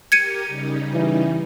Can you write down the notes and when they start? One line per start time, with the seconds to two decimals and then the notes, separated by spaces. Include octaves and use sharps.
0.12 G4 A#4 G#6 C#7 D#7
0.47 C#3 G3 D#4
0.94 E3